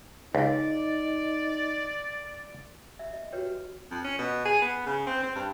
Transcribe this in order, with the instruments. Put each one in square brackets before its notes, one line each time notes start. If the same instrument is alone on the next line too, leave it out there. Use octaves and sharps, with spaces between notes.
[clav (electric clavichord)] C#2 [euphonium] D#4 [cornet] D5
[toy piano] E5
D#5
F#4 G4 B4 C#5 G5
[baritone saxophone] F2
C#4
B2
G#4
B3
C#3
C4
C4
G2